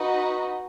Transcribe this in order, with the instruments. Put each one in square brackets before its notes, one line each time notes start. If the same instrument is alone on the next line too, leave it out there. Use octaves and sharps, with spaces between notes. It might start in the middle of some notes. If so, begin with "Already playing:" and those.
Already playing: [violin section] D#4 F#4 B4 D#5